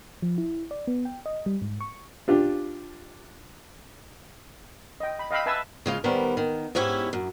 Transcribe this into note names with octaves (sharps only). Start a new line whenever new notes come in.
F3
E4
D5
B3
G5
D#5
G3
G#2
C#6
D4 F4 G4
D#5 G5
B5
D#5 F5 G5 B5 E6
B4 E5 G#5 A5 E6
C#3 G#3 F4
D#3 G3 B3 A#4 C5
D#3
G#2 B3 C#4 E4 G4
F#2